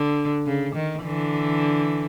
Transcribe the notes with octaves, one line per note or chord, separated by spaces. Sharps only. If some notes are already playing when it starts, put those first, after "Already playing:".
Already playing: D3
C#3
D#3
D3 E3